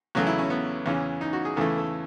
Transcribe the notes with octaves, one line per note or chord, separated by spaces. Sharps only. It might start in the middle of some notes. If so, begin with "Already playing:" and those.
E2 C#3 F#3 A3 F#4
E4
C#4
B3
E2 C#3 E3 C#4
D#4
F#4
G#4
E2 C#3 E3 A3 A4
A4